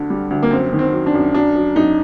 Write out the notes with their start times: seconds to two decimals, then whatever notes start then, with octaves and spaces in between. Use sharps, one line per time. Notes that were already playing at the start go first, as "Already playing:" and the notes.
Already playing: D2 D3
0.10 G3
0.30 D2
0.43 A#3
0.51 F#2 C4
0.73 D#3
0.79 C4
0.93 F#3
1.06 D4
1.14 F#2
1.34 F#3 D4
1.56 F#3
1.76 F#2 D#4